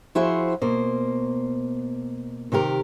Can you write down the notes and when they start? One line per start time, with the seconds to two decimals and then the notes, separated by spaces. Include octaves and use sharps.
0.15 F3 E4 F#4 G#4 C5 E5
0.62 B2 A#3 C5
2.52 C3 D#3 G4 A#4